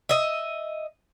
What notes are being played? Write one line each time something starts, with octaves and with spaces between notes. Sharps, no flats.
D#5 E5